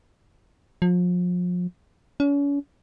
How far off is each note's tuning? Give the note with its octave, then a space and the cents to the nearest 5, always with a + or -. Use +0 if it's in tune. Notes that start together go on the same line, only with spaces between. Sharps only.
F3 +35
C#4 +40